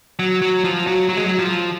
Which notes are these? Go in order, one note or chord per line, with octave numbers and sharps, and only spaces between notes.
F#3
F#3
F3
F#3
F#3
G#3
F#3
F3